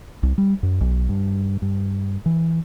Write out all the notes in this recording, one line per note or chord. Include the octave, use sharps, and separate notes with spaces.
C2
G3
F#2
B1
G2
G2
E3